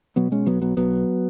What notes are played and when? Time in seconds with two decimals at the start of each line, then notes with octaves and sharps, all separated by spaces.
0.16 B2 F#3 B3
0.32 G#3 C#4
0.46 B1 F#3 B3
0.62 F#3 B3
0.77 B1 F#3 B3